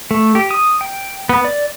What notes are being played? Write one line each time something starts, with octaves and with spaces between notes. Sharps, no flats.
A3
G4
D#6
G5
B3
D5